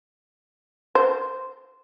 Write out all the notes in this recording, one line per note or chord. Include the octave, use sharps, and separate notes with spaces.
C5